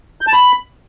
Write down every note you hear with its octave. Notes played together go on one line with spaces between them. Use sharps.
G6
A5
B5